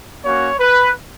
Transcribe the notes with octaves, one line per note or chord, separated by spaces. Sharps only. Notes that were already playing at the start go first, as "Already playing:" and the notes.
A#3 C#4 F#4 C#5
B4